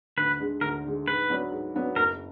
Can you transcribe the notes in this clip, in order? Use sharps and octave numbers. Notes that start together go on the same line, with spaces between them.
D2 B4
D3 G#3
D2 A#4
D3 G#3
G#2 B4
F#3 B3 D4
G#2
F#3 B3 D4
F#1 A#4